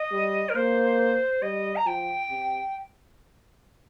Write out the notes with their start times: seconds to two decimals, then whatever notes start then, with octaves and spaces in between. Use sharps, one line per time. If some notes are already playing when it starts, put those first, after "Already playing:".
Already playing: D#5
0.11 G3
0.49 A#4
0.55 A#3 C5
1.42 G3 D#5
1.76 A#5
1.86 F3 G5
2.30 C3